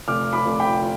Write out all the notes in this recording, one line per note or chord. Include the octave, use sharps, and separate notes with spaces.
F1 D6 F6
B5 D6
F1
G5 B5